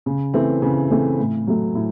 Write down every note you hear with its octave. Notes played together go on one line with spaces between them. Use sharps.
C#3
E3 A3 C4
C#3
E3 A3 C4
A2
F#3 A3
A2